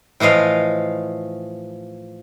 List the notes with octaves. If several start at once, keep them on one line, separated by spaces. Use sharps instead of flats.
A2 E3 F3 D#5 F5